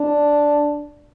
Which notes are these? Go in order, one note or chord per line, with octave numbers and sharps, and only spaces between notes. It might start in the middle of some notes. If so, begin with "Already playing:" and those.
Already playing: D4